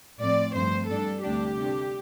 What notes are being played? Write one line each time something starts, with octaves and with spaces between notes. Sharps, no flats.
A2 F3 C4 D5
G2 F3 A3 C4 C5
G2 G3 D4 A4
D2 C3 G3 D4 G4
C3 A3 D4